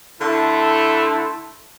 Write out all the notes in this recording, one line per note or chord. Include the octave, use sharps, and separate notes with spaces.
D3 A3 E4 C6